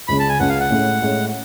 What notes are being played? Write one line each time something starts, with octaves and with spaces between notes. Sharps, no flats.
C#2 C#3 G#3 C#4 B5
A5
G#5
C#2 C#3 G#3 C#4 F#5
F5
F#5
A2 G#3 C#4
A2 G#3 C#4